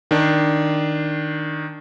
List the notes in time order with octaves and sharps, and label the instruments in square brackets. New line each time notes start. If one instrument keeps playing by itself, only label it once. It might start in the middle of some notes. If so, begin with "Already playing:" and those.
[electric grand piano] D#3 D4